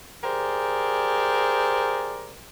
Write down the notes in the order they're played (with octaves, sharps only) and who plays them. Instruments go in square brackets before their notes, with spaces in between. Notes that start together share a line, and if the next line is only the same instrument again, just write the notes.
[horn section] G4 G#4 A#4 C5 D5